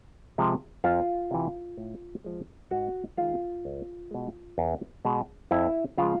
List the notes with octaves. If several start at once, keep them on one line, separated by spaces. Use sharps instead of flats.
C3 F3 G#3
F2 F4 F5
C3 E3
A2
F3 G#3
G#2 F#4 F#5
D#3 G#3 F4 F5
C#2
B2 G#3
E2
B2 G#3
F2 E4 E5
C#3 F3 G#3 F4 F5